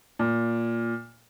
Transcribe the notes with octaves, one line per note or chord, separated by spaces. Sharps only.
A#2